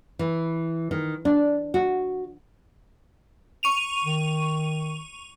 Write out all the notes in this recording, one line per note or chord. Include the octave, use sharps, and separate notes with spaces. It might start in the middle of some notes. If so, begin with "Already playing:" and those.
E3
D#3
D4
F#4
C#6 D#7 F7
D#3